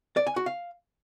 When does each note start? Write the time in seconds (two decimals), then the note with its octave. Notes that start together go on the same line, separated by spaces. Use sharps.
0.17 D5
0.27 G#5
0.36 F#4
0.46 F5